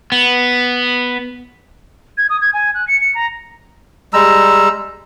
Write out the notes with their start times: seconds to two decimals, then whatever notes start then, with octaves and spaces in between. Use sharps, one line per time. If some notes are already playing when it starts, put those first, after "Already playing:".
0.12 B3
2.18 G#6
2.30 D#6
2.41 G#6
2.53 G#5
2.74 F#6
2.88 C#7
3.01 C#7
3.15 A#5
4.13 G3 G#3 A#5 E6